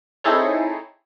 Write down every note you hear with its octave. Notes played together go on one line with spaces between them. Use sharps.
C4 D#4 E4 G#4 A4 C#5